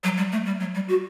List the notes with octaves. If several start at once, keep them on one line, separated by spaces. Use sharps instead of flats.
F#3
G3
A3
G3
F#3
G3
F#4